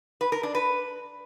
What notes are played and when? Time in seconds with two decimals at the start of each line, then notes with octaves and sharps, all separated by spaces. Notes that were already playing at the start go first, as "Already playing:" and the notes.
0.21 B4
0.32 A#4
0.43 D4
0.55 B4